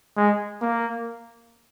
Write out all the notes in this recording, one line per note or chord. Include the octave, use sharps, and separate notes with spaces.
G#3
A#3